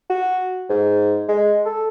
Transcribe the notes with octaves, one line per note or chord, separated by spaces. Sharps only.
F#4
G#2
G#3
A4